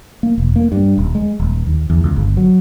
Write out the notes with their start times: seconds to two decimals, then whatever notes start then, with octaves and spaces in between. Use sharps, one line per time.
0.23 A#3
0.38 E1
0.56 A#3
0.72 G2
0.98 D#1
1.15 G#3
1.39 D#1
1.67 D#2
1.90 E2
2.04 C#2
2.16 G1
2.37 F#3